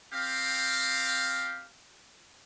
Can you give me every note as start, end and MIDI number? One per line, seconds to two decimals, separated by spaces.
0.14 1.66 60
0.14 1.66 67
0.14 1.66 77